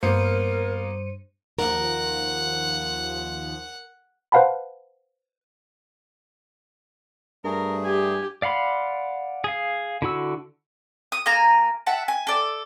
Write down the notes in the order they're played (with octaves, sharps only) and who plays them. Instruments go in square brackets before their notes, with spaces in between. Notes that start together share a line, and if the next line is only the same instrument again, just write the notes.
[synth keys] G2 C#7 D#7 [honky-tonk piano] A#3 B3 [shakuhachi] A#4 [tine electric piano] C5
[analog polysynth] D#2 F3 [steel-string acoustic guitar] A#4 [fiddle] F#5
[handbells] B4 C5 F5 F#5 A5 B5
[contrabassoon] G2 [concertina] A3 G#4 [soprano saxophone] A#4
[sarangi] G4 [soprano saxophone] G#5
[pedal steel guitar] D5 F5 F#5 B5 C6
G#4 F5
D3 E4 F#4 E6
[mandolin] D#6
A#3 G#5 A#5
E5 F#5 A5
G#5
A4 D5